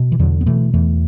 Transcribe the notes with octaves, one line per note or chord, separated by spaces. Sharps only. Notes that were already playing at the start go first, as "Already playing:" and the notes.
Already playing: B2
E3
E2 D3 F#3
B3
B2 E3 A3
E2 E3 A3